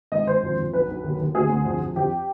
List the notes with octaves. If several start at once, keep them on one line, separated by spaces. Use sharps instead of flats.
G#1 D#5
G#1 C5
F2
F2
B1 B4
B1
D#2
D#2
D2 G#4
D2
F2
F2
F2 G4